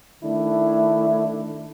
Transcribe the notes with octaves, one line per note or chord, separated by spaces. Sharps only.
D#3 A3 D4 E4